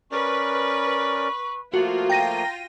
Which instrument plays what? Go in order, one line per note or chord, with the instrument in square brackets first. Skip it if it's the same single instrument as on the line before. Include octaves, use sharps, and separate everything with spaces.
[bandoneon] C#4 A#4 D5 [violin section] B4 [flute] C#6
[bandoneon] F3 A3 A#3 [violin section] F4 [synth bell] F#4
[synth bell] G5 A#6 D#7 [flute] A#5